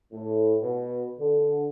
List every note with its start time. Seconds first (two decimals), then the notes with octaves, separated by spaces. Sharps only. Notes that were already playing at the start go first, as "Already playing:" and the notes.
0.12 A2
0.62 B2
1.19 D3